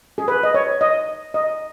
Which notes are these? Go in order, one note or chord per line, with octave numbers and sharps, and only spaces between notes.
G#4
B4
D#5
C#5
D#5
D#5